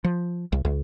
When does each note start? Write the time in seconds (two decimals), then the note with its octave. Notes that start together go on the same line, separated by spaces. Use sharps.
0.04 F3
0.52 C2
0.65 C#2